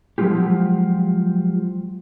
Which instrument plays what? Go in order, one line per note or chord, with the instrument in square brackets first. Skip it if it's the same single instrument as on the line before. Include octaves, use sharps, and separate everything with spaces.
[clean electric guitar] F3 F#3 G#3 F4 G4